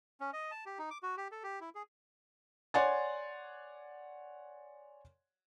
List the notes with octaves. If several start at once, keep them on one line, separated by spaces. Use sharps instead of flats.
C#4
D#5
A5
G4
D#4
D6
F#4
G4
A4
G4
E4
G#4
C#5 D5 F#5 G#5 C6 A6